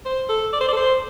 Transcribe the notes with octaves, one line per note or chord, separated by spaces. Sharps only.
C5
A4
D5
C5
D5
A4
C5